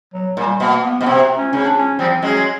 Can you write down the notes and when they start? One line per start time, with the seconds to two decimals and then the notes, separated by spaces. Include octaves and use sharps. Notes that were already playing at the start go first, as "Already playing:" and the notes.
0.14 F#3
0.37 A#2 G3
0.60 B2 A#3
0.83 B3
1.01 B2 B3
1.06 C3 C4
1.37 C#4
1.52 C#3 C#4
1.65 D4
1.77 C#4
1.99 F3 G3 C4
2.22 F#3 G#3 C#4